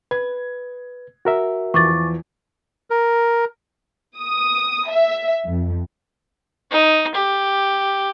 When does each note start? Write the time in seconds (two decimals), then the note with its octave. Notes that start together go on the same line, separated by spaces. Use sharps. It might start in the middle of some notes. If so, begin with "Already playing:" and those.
0.11 B4 G#6
1.25 F#4 A#4 E5
1.74 E2 E3 F3 C#6 D6 A6
2.90 A#4
4.20 D#6
4.89 E5
5.45 F2
6.71 D#4
7.15 G4